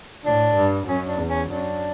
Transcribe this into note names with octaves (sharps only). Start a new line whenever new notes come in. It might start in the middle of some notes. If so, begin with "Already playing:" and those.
A2 D4
G2
F#2 C#4
D4
E2
C#4
F#2 D4